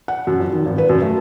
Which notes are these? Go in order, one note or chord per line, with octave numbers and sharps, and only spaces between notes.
F#5
F#2
F2
D#3
G#1
B4
F#2
A3